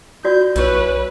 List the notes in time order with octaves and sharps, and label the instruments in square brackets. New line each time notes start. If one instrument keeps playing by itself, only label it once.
[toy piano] F4 F#4 D5 [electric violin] G6
[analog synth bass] B1 [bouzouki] C#4 E4 [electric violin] B4